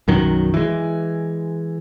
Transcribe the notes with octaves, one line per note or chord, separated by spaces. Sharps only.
B1 F#2 D#3 F#3
E3 G#3